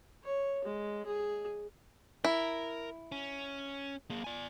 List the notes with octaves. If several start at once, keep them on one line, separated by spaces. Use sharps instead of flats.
C#5
G#3
G#4
E4 A#4
C#4
A#3 G#4
D5 G#5